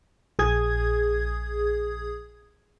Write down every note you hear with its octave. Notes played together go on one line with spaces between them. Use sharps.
A#1 G#4 D#6 G#6